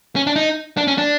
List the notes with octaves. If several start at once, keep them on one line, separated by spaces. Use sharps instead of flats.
C#4
D4
D#4
D4
C#4
D4